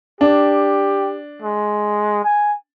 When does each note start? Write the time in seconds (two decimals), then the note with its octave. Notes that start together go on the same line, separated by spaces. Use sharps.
0.21 D4 G4
1.42 G#3
2.24 G#5